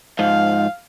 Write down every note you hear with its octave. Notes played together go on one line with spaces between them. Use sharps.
G#2 F3 F5